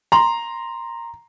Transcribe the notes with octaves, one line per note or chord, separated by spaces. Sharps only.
A#5 C6